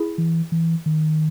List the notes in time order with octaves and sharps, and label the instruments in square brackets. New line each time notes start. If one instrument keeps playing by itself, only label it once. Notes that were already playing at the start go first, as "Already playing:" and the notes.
Already playing: [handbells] E4 G#4
[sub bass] E3
E3
D#3